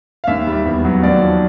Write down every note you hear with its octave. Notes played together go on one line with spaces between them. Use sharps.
F5
D#2 E5
G3
E2
F#3
D#2 D5
F3